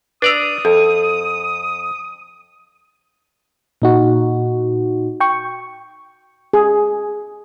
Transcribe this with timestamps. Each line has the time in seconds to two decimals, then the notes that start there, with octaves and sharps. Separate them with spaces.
0.22 D4 B4 D5 A#5 D#6 E6
0.65 F2 A4
3.82 A#2 D#4 F#4
5.20 G5 C#6
6.53 G#4